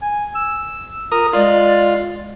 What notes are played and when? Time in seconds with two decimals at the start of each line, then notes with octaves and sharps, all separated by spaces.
0.02 G#5
0.35 E6
1.12 F4 A#4 D#6
1.33 G#3 F4 D5